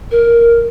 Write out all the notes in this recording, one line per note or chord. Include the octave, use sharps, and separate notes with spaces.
A#4